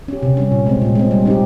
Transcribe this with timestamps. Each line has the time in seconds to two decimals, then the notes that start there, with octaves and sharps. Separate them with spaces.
0.08 C#4 G4
0.23 C3
0.37 G3 C#4
0.52 A#2
0.66 G#3 C4
0.82 A#2
0.95 G#3 C4
1.11 G3
1.25 C4 D#4 G4